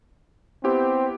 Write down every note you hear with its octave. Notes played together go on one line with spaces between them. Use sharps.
B3 C4 E4 G4